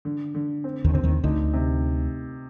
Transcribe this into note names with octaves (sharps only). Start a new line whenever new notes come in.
D3
D3
C4
D#2 D#3
D3 C4
D#2 D#3
D2 D3 D#4
C3